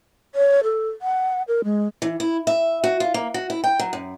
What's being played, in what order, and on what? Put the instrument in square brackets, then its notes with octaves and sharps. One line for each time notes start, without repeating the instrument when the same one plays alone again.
[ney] C#5
A4
F#5
A#4
G#3
[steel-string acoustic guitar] E3
E4
E5
F#4
F4
A#3
F#4
E4
G5
F#3
F#2